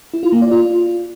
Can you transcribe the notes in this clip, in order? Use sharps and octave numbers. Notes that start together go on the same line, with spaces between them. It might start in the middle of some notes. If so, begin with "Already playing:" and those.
E4
F4
A#3
D5
F4